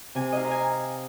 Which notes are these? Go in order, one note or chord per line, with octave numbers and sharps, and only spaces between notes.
C3 G#5
D#4 D#5 F5
A#5
G#5